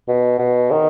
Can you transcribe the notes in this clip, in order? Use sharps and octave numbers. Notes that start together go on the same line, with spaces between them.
B2
B2
D#3